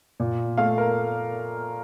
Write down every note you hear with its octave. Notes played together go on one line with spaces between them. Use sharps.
A#2
A3 F5
A#4